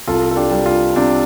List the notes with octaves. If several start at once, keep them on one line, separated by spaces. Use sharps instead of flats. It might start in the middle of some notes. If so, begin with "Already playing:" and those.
C2 F4 A4
A4
D4 G4
G3
F4
C3 D4